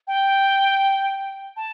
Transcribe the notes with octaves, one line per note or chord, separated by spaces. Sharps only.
G5
A5